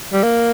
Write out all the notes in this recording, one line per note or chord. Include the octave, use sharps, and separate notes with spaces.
G3
A#3